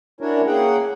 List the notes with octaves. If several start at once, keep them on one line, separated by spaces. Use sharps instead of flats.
C#4 D4 E4 F#4 A#4 C#5
A#3 C#4 G#4 F#5 G5